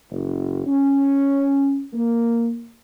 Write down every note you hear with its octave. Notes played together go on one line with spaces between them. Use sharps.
F#1
C#4
A#3